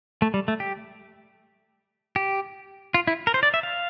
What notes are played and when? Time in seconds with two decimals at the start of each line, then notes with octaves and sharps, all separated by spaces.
0.22 A3
0.34 G3
0.48 A3
0.60 G4
2.16 G4
2.94 F4
3.07 E4
3.27 A#4
3.34 C5
3.43 D5
3.54 E5
3.63 F5